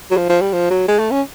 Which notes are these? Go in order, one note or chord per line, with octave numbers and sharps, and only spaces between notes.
F#3
F3
F3
G3
F3
F#3
G#3
A3
C#4